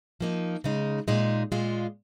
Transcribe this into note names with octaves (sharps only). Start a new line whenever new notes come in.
F3 A#3 D#4
C#3 G#3 D#4
A#2 G#3 D#4
A#2 G#3 F4